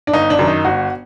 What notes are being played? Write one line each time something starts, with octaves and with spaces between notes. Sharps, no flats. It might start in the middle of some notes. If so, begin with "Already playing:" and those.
D4
G1 D#4
D4
F#2 D#3
D#4
G1 F#4